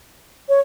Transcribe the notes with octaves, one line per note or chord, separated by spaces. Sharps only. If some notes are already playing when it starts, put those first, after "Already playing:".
C#5